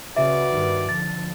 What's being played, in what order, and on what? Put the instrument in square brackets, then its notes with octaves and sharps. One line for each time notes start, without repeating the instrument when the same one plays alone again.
[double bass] C#3 [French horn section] F#4 B4 [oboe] D5 [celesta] E5
[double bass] G2 D#3
[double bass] D3 F3 [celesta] A6